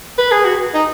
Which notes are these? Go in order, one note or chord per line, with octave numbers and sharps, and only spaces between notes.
B4
G#4
F#4
D#4